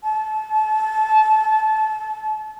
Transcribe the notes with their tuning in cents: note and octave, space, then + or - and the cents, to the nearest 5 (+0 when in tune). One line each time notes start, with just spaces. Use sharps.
A5 -30